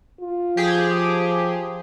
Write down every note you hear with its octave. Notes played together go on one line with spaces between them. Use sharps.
F4
F3 G4 G#4